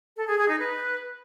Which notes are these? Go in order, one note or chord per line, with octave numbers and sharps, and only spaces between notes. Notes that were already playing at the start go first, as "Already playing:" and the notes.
A4
G#4
G#4
D#4
B4